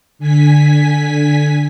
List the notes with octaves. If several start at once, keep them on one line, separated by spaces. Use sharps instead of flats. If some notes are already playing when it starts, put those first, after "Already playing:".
D3 G#5 B6